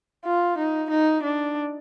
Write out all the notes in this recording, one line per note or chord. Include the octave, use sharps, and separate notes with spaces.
F4
D#4
D#4
D4